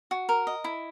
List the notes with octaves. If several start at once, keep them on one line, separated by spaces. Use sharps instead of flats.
F#4
A#4
D#5
E4